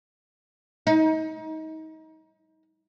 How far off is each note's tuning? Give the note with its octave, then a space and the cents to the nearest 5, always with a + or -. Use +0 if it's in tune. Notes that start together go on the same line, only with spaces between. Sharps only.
D#4 +30